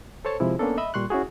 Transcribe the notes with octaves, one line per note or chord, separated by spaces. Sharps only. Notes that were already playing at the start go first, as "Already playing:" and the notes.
A4 C5 C#5 A5
C3 F3 G#3 E4
A#3 B3 C#4 D4 A4
D#5 E5 B5
A#2 G3 C6 C#6 F#6
C#4 E4 F#4 G#4